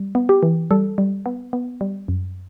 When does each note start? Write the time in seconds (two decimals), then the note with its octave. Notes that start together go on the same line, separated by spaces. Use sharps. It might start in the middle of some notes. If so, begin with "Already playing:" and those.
Already playing: G3
0.15 B3
0.29 G4
0.43 E3
0.71 G3 A4
0.98 G3
1.26 B3
1.53 B3
1.81 G3
2.08 F#2